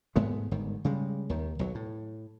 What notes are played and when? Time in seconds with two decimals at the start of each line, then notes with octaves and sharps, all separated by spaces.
0.16 G#2 G#3 A3 B3
0.51 G1 G#2 D#3
0.85 C#3 G3 G#3
1.29 D#2 D#3
1.59 B1 F#3
1.75 A2